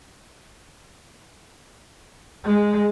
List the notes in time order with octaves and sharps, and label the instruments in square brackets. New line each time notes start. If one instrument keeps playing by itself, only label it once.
[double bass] G#3